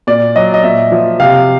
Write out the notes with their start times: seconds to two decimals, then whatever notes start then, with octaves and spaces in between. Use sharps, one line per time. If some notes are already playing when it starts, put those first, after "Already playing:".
0.07 A#2 D5
0.36 F#3 D#5
0.54 D#5
0.63 A#2 E5
0.92 F3
1.20 C3 F5